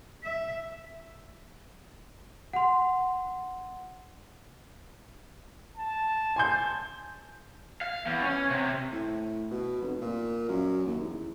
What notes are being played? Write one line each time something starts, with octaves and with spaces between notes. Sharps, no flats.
E5
F#5 C6
A5
G#5 C6 G6
F5
E2
C#4
C3
A2
B2
F1
A#2
F#2
D#2
E2